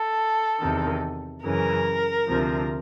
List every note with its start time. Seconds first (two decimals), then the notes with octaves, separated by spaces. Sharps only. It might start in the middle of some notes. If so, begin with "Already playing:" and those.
Already playing: A4
0.60 E2 C3 D#3
1.44 F#2 C#3 E3 A#4
2.28 D2 C3 F3